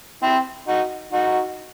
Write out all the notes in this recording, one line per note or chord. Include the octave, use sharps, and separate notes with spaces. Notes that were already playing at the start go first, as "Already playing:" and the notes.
C4 E4
D#4 F#4
D#4 F#4